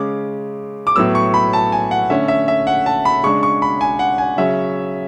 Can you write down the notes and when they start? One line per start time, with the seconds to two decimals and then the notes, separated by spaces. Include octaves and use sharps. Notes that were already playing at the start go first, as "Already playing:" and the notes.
Already playing: C#3 G#3 C#4 D6
0.87 D6
0.96 A2 F#3 B3 E6
1.15 C#6
1.34 B5
1.53 A5
1.72 G#5
1.91 F#5
2.10 D3 A3 C#4 E5
2.28 E5
2.48 E5
2.67 F#5
2.86 A5
3.05 B5
3.23 C#3 G#3 D4 C#6
3.43 C#6
3.62 B5
3.81 G#5
3.99 F#5
4.18 G#5
4.38 C#3 F#3 C#4 E5